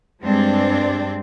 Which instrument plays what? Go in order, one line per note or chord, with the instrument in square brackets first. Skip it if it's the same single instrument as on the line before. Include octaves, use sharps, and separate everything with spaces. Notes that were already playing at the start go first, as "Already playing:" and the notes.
[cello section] G2 G#3 C4 D4